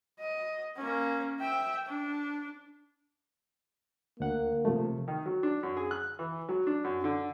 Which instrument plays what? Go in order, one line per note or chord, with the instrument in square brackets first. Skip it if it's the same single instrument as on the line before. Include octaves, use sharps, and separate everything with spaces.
[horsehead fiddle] D#5
A#3 C#4
E5 G5
D4
[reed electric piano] D2 F#5 [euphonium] A#3
[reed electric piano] C3 F3 A3
[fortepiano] D#3
F#3
D4
F#2
G#4
F#6
E3
F#3
D4
F#2
D3